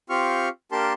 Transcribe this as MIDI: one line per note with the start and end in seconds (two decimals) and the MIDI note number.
0.10 0.49 60
0.10 0.49 65
0.10 0.49 67
0.10 0.49 77
0.10 0.49 85
0.10 0.49 89
0.72 0.93 58
0.72 0.93 62
0.72 0.93 67
0.72 0.93 70
0.72 0.93 81
0.72 0.93 84